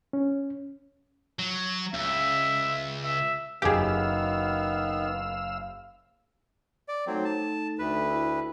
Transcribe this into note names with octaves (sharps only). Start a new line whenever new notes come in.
C#4
F#3
C#2 E5
E5
F#1 F#2 D#3 B3 G4 G#4 F5 E6
D5
F#3 A3 C4 D#4 A4
A5
D2 B4
E4